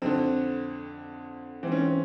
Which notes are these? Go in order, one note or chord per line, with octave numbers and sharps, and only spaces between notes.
F2 D3 C4
G#2 E3 C4
C#4
C4